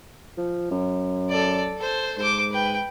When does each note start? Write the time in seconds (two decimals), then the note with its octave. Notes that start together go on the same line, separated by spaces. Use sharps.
0.38 F3
0.71 F#2
1.29 A4 D5
1.78 A4 C5
2.17 G#2 C5 D6
2.52 B4 G5